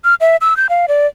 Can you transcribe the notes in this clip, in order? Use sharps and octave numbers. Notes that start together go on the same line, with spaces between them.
F6
E5
E6
G6
F5
D5